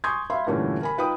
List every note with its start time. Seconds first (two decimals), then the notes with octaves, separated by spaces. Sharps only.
0.04 G#5 C6 C#6 D#6 G6 G#6
0.30 E5 F5 B5 C6
0.46 G2 A#2 D3 E3 A3 C#4
0.81 A#4 G#5 B5
0.97 D#4 F4 B4 G5 B5 D#6